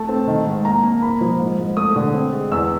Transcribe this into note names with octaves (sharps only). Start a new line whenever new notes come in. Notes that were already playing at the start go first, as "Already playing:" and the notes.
Already playing: A3 A5
C4
D#3
G#2
A#3 A#5
A#3
A#3 B5
F3
G#2
G#2
A3 D#6
D3
C4
G#3
E2 E6